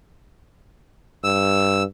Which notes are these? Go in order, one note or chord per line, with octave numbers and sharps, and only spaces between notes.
G2 E6